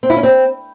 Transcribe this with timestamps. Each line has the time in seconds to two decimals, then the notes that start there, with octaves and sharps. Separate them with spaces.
0.03 C4
0.10 E4
0.16 C#4
0.23 C4